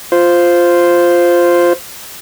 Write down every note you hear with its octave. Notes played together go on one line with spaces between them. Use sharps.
F4 C5